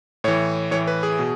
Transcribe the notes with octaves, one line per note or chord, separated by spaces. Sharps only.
A2 E3 C#5
A2 E3 C#5
B4
G#4
B2